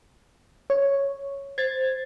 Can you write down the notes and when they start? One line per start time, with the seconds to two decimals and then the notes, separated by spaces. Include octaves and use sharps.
0.70 C#5
1.58 C5 G#6 A6